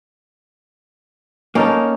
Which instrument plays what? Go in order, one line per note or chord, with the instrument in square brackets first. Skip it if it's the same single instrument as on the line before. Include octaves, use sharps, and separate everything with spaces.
[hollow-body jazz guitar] A#3 [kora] C#4 D#4 A4